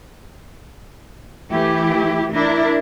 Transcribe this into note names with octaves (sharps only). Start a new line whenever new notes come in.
E3 A3 E4 G4
D4 E4 A#4